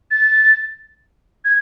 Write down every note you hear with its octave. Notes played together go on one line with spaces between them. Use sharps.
A6
G#6